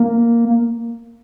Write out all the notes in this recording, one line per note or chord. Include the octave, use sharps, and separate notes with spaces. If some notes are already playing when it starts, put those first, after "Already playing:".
Already playing: A#3